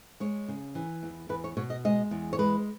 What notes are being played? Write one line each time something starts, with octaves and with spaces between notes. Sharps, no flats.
G#3 C#5
C#3
E3
E2
E2 B4
C#5
B2 C#5
D#5
G#3 D#5
E2
C#5
G#3 B4